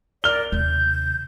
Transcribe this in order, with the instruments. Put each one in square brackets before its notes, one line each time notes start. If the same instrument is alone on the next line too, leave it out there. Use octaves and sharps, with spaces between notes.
[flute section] A#4 D5 [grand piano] F6 G7
[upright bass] D#2 C3 [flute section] G6